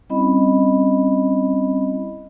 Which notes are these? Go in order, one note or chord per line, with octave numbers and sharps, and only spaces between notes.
G3 C4 C#4 E4 D#5 B5